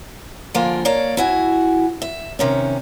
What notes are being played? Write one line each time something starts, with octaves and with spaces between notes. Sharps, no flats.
D3 F3 A#3 F4 G#5
A#3 C#5 D5
E4 F#4 G#5
E5
C3 D#3 C#4